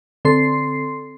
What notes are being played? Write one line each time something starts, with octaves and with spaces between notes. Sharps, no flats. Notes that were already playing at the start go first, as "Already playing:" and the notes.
D3 C4 A4 C6 C7